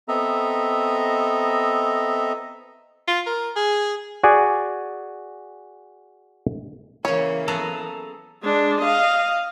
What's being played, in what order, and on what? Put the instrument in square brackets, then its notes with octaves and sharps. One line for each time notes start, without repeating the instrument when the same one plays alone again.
[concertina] B3 C4 A4 D#5 E5 A#5
[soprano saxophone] F4
A#4
G#4
[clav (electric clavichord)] F#4 G#4 D5 G#5
[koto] C#3 C#4 [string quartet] E3 A#3 [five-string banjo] C#5
[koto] F#3 B3 G#4 [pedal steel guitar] A4 A5 A#5
[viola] G#3 D4
D#5 F5